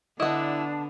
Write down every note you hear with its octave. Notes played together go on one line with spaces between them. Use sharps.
D3 B3 D4 E4 D#5 A5